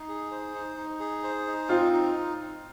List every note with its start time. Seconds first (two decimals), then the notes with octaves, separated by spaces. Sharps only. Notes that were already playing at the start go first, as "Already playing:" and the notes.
Already playing: D#4
0.09 G#4
0.31 C5
0.55 D#4
0.78 D#4
1.00 G#4
1.24 C5
1.47 D#4
1.69 C4 F4
1.92 D#4